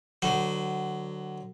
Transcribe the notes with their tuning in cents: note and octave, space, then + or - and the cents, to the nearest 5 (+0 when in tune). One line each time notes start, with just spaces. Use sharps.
D3 +25 F#3 +15 C5 -25